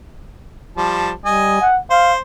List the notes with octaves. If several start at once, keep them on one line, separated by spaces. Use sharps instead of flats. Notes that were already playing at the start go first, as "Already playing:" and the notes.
F3 G3 A5
G3 D#5 G#5
F#5
C5 F5